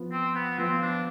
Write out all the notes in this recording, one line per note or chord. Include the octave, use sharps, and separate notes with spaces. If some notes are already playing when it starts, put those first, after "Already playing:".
Already playing: F3 B3 F4
C4
B3
F3 B3 C4 F4
D4